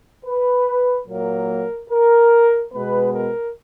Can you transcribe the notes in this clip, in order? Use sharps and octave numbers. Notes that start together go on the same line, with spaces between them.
B4
A#2 F#3 A#3 A#4
A#4
B2 G#3 B3 B4
A#4